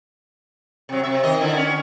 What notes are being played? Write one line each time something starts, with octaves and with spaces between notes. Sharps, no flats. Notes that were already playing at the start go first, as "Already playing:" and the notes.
C3 F#3
C3 E5
D#3 D#5
D3 E4
C#4